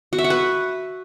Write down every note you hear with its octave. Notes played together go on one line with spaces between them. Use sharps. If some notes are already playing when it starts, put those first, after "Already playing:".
F#4
E5
F#5
B4